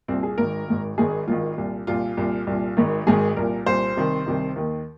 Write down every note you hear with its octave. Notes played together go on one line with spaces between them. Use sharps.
C2 A#2 C4
G#4
G#1 G#2 D#3 A#4
G#1 G#2 D#3
G#1 G#2 D#3 G#4
G#1 G#2 D#3 F4
C2 A#2
C2 A#2 F4
C2 A#2
C2 A#2
G#1 G#2 D#3
G#1 G#2 D#3 G#4
C2 A#2 A#4
C2 A#2 C5
C2 C3 D#3
C2 C3 D#3
D#2 D#3